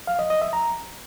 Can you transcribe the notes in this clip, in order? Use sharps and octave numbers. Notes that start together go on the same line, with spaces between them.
F5
D#5
D#5
E5
A#5